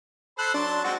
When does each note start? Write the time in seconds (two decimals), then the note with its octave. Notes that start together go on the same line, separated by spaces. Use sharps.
0.39 A4 C5 B5 F#6
0.54 F#3 D4 A5 C6
0.84 G#3 C4 F#4